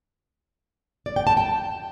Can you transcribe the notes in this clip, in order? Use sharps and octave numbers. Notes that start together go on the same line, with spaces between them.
D5
G5
A5
G5